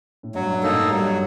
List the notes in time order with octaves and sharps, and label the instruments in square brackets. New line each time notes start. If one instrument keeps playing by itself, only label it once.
[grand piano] A2
[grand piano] G2 [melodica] F#3
[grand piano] G2
[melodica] A#3 D#4 A4
[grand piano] A2
[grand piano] G2 G3 [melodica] F#3